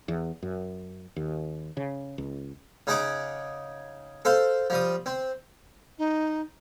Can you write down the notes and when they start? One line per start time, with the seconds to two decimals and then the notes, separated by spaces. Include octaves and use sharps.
0.08 E2
0.43 F#2
1.16 D#2
1.77 C#3
2.18 C#2
2.87 C#3 D#4 G#4 F#5 D6
4.25 A4 C5 F5
4.70 F3 G3 D#6
5.06 C4
5.98 D#4